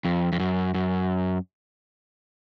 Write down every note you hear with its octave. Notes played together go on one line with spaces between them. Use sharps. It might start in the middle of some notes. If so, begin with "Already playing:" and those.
F2
F2
F#2
F#2